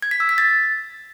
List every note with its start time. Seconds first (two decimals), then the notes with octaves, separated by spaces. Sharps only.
0.02 G#6
0.11 B6
0.20 E6
0.29 B6
0.38 A6